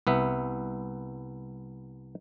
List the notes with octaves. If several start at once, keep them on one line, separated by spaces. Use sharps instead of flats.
C2 B3 E5